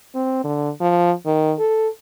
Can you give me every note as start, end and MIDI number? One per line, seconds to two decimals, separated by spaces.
0.15 0.40 60
0.44 0.69 50
0.80 1.12 53
1.26 1.54 51
1.59 1.88 69